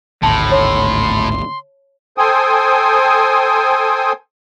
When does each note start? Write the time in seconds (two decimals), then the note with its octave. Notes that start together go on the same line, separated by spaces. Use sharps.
0.23 G#1 D2 A2 A5 C6
0.51 C#5 C6
2.18 A4 C5 G5 G#5 D#6